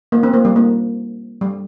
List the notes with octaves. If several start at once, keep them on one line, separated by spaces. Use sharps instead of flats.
A#3
C4
A#3
G3
A#3
G3